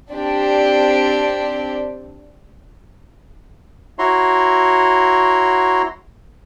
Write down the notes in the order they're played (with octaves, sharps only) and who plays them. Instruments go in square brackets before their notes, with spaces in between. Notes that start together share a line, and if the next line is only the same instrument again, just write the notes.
[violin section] C4 D4 G4 D5
[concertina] E4 F#4 C#5 A#5 C6